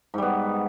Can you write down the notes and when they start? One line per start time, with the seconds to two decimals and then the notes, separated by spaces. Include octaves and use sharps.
0.14 G#2
0.18 G3
0.22 B3